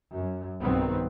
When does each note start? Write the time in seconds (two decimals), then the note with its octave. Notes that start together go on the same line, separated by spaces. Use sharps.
0.12 F#2
0.61 B1 G2 D#3 B3 C4